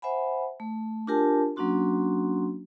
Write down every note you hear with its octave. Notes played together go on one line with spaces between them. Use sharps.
C5 E5 F#5 G#5 B5
A3
D4 F4 G4 A#4 G#5 A5
F#3 A#3 C#4 D4 F#4 C6